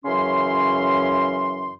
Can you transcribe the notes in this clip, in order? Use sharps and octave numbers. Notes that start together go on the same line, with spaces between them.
F#2 C#3 E3 F#3 C#4 C6